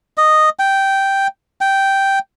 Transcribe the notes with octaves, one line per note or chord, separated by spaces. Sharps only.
D#5
G5
G5